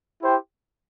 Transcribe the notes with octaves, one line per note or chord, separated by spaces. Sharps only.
E4 G4 C5 G5